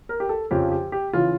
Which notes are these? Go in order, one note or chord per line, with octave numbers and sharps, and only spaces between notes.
A#4
G4
A4
F2 C#3 F3 G4
G4
G4
C#3 E3 F4